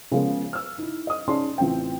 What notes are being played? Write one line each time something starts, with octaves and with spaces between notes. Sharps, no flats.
C#3 F3 G#3 B3 C#4 A#4
E6 F6
D#4 E4
D#5 D#6
C#4 D#4 G#4 D5 A5 C6
A1 C4 F4 G5